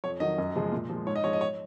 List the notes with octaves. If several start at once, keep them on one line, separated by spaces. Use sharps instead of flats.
F2 C#5
D#3 F#3 D#5
F#2
C#3 F3 G#3
A#2
F3 G#3
G#2 C#5
D#5
F3 G#3 C#5
D#5
C#5